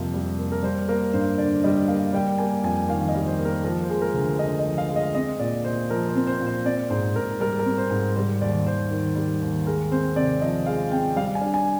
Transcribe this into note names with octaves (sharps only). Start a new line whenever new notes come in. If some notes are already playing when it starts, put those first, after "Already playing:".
Already playing: F2 C3 G3 A#3
G3
A#3
A#4
G3 C5
A#3 A#4
G2 C5
D3 D5
G3 D#5
A#3 F5
G3 G5
A#3 G#5
F2 G#5
D#3 F5
D#5
G3
C5
A#3
A#4
F3 A#4
C5
G#3
A#4
D2
D3 D#5
D#5
F3
F5
G#3
D#5
C4 D#5
A#2 D5
A#2 C5
F3 A#4
C5
C4
C5
A#2
C5
C4 D5
G#2 C5
G#2 A#4
G3 A#4
A#4
C4
C5
G#2
G3 C5
D#2 D5
D#2 C5
D#3
G3
D#2
G#3 A#4
C4 C5
C3 D5
F3 D#5
G#3 F5
C4 G5
G3 F5
G#5
D4
G#5